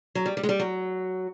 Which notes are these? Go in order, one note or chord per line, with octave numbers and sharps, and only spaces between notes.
F#3
G3
G3
G#3
G3
F#3